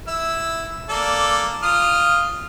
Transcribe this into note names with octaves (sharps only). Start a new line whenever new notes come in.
E4 E6
A#3 A4 D5
F4 D#6 F6